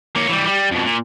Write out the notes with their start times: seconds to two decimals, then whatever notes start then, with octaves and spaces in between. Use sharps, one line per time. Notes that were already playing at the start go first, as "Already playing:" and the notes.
0.16 A#3 C#5
0.29 E3 G3
0.47 G3
0.72 F2 B2
0.85 A#2